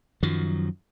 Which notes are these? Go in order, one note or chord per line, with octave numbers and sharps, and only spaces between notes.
F#2 D#3 F3 F#3